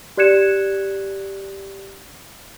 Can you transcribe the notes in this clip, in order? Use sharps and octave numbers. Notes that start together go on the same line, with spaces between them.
G4 D5 F#6 G#6 C#7 E7